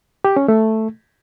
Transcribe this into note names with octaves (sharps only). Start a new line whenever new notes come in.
G4
C#4
A3